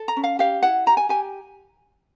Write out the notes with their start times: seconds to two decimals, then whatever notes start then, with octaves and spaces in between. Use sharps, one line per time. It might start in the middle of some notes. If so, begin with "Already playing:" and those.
Already playing: A4
0.08 A#5
0.17 C#4
0.24 F5
0.39 G4 F5
0.63 E4 F#5
0.86 G4 A#5
0.97 G#5
1.09 G4 G#5